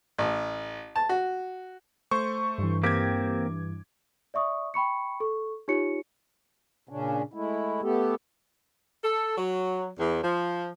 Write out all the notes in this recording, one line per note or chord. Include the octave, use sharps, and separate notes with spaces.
A1
A5
F#4
A3 C5 C#6
G2 E3
A#3 C4 G4 D6 G#6
D5 E5 C#6 D#6
G5 B5 C#6 C#7
A4 C#6
D#4 F4 G4 C#5 C#7
A#2 C#3 C#4 D4
G#3 A3 E4
A3 B3 G4 A4
A4
F#3
E2
F3